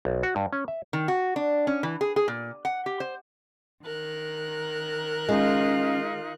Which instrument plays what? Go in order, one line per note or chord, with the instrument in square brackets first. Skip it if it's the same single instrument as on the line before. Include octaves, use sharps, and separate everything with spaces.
[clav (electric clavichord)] B1
F#4
G2
C#4
E5
[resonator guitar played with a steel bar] D#3
F#4
D4
C#4
E3
G#4
G#4
A#2
F#5
G4
C5
[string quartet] D#3 A#4 F#6
[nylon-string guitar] G#3 [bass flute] C#4 [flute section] D#4 F4 F5